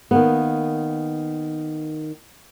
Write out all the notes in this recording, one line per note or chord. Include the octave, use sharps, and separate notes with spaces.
D#3 A#3 B3